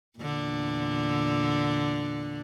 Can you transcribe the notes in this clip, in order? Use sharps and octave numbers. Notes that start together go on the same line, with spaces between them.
E2 A#2 D3